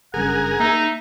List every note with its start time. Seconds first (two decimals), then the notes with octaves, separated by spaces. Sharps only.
0.14 F#1 G2 C#4 G#4 A#4 F#5
0.60 A#3 D#4 E5